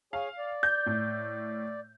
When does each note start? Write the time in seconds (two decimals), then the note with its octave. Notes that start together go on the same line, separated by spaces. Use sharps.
0.13 G#4 C#5 F5 G#5
0.38 D5
0.63 G6
0.86 A2